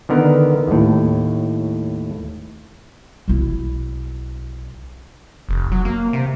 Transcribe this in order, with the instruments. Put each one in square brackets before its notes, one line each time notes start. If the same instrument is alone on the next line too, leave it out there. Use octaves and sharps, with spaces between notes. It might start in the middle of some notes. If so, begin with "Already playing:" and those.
[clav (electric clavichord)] D3 D#3 B3 A#4
D#2 A2
[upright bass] B1 E4
[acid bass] F1
F#3
A#3
C3